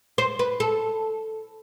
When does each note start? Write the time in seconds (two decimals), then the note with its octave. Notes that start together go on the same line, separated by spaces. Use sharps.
0.18 C5
0.39 B4
0.60 A4